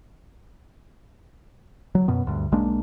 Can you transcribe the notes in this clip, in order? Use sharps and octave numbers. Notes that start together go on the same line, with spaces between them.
F#3
F#2 B2 B3
D2 G2
B1 G#3 A#3 D4